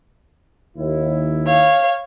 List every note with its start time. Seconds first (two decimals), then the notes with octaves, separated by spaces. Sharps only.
0.78 D#2 E4
1.46 C#5 F5